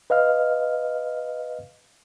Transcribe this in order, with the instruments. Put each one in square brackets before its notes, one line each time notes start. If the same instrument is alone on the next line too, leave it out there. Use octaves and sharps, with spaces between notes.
[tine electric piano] B4 D#5 F5 F6